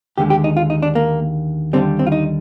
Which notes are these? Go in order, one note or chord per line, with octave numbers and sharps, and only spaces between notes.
D#2 D3 G#3 G4
G4
D#4
F4
D#4
D4
A#3
D#2 D3 G3 C4
C4
F4
D#4